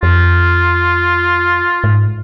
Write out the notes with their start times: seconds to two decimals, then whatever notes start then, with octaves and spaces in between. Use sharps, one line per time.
0.03 F2 F4
1.84 G#2